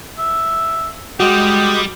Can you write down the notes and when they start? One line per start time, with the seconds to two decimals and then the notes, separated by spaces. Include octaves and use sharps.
0.18 E5
1.20 G3 G#3 F#4 G5 D6 D#6